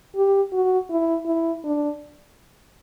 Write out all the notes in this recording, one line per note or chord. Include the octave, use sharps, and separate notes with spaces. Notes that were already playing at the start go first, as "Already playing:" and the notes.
G4
F#4
E4
E4
D4